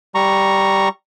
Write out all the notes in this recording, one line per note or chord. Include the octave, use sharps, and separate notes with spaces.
G3 A#5 C#6